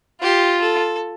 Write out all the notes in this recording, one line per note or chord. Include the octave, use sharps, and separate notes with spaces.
F4 G4
A4